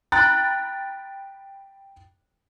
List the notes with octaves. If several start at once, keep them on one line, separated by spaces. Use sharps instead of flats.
G5 A#5 B5 F#6 A6